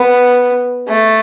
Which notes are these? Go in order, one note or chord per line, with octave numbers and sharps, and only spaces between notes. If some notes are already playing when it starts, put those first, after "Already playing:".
Already playing: B3
A3